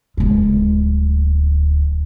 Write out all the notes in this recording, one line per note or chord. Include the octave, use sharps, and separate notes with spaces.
D1 G#3